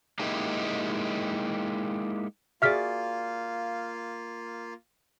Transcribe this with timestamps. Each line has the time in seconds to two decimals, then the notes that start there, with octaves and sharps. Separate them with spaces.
0.19 G#3 A#3 D#4 E4 G4
2.62 A#3 F4 F#4 G#4 D5 E5 F6 B6